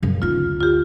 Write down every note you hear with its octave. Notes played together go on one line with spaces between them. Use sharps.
F#2 C#3
D2 D#4 F4
F4 G4